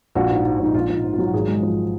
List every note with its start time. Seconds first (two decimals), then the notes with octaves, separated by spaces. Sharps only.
0.15 A#1 F#4
0.30 G#2
0.44 G#2
0.59 A#1 D#4
0.74 A#1 F4
0.90 A#1 D#4
1.04 G#2
1.13 F4
1.18 F#3
1.26 F#4
1.33 G#1 G#4
1.48 G#3
1.63 F3